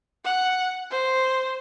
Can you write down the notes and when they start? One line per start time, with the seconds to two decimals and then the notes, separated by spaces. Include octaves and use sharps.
0.25 F#5
0.91 C5